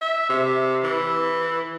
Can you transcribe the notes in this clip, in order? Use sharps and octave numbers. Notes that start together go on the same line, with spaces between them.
E5
C3
E3